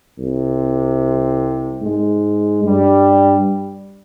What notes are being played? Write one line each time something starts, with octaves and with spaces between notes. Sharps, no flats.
C2 C3
G#2 G#3
G2 G3